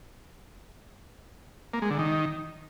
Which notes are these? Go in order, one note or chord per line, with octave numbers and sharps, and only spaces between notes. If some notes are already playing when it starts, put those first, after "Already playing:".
A#3
G#3
D3
D#3